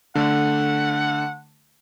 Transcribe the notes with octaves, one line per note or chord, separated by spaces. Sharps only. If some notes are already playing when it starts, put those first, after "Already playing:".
D3 A3 F#5